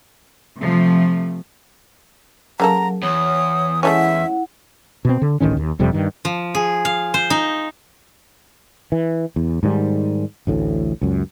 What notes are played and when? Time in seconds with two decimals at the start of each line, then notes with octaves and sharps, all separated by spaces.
0.59 C3 F3 A3
2.60 C#3 F#3 A#3 A4 A#4 A#5
3.03 E2 C#5 D#6
3.83 G#3 A3 C#4 E4 E5 F#5
5.05 B2 C4
5.22 D3
5.40 D1 A1 D#3 C#4
5.57 D#2
5.79 F#1 F2 C3 G3
5.93 G2 D#3
6.25 F3
6.55 G#4
6.85 F5
7.14 C5
7.30 D#4
8.92 E3
9.36 E2
9.63 G#2 D#3 G3
10.47 A1 D2 A2
11.01 C#2 F#2